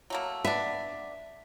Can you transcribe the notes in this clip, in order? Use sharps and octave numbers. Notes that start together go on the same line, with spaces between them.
F#3 A3 A#3
B3 D4 E5